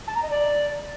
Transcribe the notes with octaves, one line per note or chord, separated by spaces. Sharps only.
A5
A#5
D#5
D5